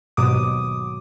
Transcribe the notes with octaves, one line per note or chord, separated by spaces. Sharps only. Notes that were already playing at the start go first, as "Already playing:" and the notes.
D#2 G#2 B2 F#3 D6 D#6